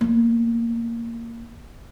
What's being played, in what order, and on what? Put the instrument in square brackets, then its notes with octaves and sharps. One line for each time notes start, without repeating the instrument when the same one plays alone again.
[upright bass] A#3 B3